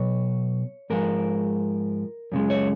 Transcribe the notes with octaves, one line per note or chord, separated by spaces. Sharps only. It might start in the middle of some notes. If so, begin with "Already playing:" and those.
Already playing: B2 F#3 C#5
G#2 F3 G#3 A#4
F#2 C#3 G#3
C#5